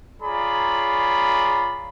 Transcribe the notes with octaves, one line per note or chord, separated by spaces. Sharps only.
F4 G#4 C#5 D5 A#5 B5